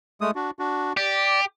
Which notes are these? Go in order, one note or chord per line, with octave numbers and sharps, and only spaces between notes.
G#3 A3 D#6
D4 F#4
D4 F#4
G4 D5